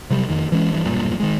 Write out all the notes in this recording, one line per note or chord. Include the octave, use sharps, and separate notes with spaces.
C3 F#3 G3
F2 D#3
E3 G#3 C#4
G2 E3
E1 B1 G2 A#2
D#3 G#3